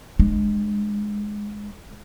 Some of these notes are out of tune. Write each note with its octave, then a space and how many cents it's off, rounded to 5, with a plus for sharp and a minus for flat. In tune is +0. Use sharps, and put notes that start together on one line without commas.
G#3 +0 D4 +30